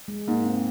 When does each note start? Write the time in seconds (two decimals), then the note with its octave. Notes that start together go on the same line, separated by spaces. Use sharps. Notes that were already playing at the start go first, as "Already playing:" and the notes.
0.08 G#3
0.28 G#2 A#3
0.46 C4